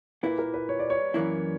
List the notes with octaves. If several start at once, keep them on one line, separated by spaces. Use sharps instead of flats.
A#2 A#3 E4 B4
A#4
B4
C#5
D5
C#5
F#2 E3 A#3 E4